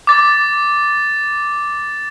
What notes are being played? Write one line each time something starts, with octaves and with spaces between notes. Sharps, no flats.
D6 A6